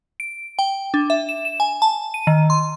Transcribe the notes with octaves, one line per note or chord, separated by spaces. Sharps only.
D7
G5
D4
E5
E7
E7
G#5
A5
D#7
D#3
C6